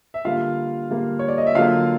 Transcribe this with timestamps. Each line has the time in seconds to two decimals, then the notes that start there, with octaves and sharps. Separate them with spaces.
0.14 E5
0.25 D3 G3 A#3 F4 F5
0.90 D3 G3 A#3
1.19 C#5
1.28 D5
1.38 D#5
1.47 E5
1.55 D3 F#3 A#3 F4 F5